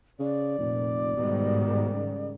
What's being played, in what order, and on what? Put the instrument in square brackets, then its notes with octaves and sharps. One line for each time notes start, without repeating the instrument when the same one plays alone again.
[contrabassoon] C#3 [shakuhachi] D5
[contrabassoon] F1 [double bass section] A#2
[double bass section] G#2 D#3 G3 [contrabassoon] B2
[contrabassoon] C#3